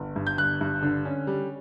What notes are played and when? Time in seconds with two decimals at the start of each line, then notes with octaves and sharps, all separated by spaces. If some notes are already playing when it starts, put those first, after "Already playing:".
Already playing: G1
0.16 G2
0.27 G6
0.38 G1 F#6
0.61 G2
0.82 D3
1.05 C#4
1.27 G3